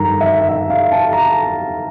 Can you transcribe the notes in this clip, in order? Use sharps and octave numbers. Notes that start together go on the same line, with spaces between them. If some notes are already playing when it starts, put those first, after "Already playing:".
Already playing: G2 D#3 A#5
E5
E5
F5
A5
A#5